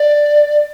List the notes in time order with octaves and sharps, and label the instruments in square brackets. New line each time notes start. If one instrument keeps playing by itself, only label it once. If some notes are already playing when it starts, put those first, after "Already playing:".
Already playing: [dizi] D5